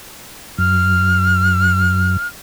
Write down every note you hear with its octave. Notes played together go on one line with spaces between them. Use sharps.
F#2 F6